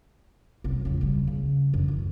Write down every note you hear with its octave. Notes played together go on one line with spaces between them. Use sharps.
C2 F#2
E1 C#2
C#3 G3
C#3
F#2 D3
E3